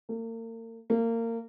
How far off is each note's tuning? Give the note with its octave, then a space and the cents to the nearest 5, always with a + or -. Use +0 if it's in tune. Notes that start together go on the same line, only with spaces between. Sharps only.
A#3 -40
A#3 -25